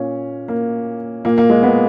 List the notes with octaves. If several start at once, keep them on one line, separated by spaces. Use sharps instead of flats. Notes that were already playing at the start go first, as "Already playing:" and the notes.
Already playing: A#2 C#4
A#3
A#2 A#3
A#3
G#3
B3